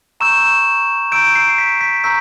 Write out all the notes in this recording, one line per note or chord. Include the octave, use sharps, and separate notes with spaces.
A#5 C#6 E6 G6 E7
A#5 C#6 E6 G6 D7
C7
B6
B6
A#5 C#6 E6 G6 B6